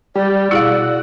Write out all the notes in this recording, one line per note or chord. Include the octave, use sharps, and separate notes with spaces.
G3 G4 D5
B2 E4 F#4 G#4 F5 E6